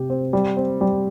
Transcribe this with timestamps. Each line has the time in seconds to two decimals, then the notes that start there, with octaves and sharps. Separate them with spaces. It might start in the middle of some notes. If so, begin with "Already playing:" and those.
Already playing: C3 G4
0.10 C4
0.33 G3
0.57 C4
0.81 G3